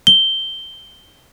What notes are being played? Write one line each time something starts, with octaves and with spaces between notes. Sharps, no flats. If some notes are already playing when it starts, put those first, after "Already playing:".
G7